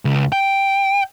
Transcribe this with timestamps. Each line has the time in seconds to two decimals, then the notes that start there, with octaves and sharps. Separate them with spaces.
0.05 C#2
0.32 G5